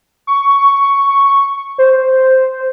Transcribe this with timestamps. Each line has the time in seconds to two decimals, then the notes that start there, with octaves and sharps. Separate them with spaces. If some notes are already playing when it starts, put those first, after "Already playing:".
0.27 C#6
1.78 C5